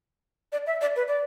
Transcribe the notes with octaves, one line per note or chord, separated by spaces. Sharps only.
D5
E5
D5
B4
D5